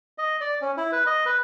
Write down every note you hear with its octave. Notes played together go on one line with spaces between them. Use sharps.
D#5
D5
C#4
E4
B4
D#5
B4